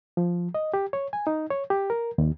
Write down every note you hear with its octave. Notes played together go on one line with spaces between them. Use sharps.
F3
D#5
G4
C#5
G#5
D#4
C#5
G4
A#4
D#2